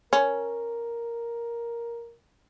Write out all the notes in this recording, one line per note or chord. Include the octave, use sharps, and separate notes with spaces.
C#4 A#4